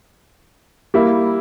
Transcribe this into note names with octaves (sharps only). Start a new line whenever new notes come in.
G3 A#3 E4